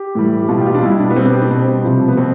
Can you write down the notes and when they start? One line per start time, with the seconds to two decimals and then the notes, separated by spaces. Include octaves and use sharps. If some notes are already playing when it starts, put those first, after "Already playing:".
Already playing: G4
0.15 A2 E3 G3
0.42 G4
0.49 B2 G3 F4
0.61 G4
0.66 F4
0.75 D4
0.83 B2 G3 E4
1.00 D4
1.10 B3
1.16 B2 G3 C4
1.25 B3
1.34 C4
1.42 D4
1.51 B2 G3 C4
1.84 C3 F3
2.08 B3
2.17 B2 C4